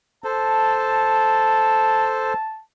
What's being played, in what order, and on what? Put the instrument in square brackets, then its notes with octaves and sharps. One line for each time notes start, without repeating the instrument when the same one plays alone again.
[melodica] A4 C5 [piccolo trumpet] A5